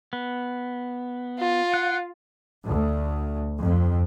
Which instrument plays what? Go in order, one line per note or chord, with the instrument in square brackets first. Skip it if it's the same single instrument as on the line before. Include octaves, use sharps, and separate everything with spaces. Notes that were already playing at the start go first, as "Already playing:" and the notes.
[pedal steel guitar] B3
[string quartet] F4
[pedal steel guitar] F#5
[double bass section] D2
F2